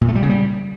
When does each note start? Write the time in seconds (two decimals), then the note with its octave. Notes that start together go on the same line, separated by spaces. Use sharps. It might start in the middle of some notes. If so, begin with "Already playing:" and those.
0.01 A#2
0.08 A3
0.15 G3
0.22 C#3
0.30 G3